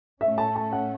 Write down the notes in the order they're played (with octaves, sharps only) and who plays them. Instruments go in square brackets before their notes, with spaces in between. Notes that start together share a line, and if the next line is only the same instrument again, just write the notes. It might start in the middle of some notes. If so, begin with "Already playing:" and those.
[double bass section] A2 A3 C#4 [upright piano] E5
[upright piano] A5
A5
F#5